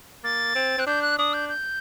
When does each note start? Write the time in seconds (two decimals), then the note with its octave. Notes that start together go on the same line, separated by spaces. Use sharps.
0.24 A#3 A6
0.55 C4
0.78 C4 F#6
0.87 D4 G6
1.02 F#6
1.18 D4 D#6
1.33 G6
1.49 G6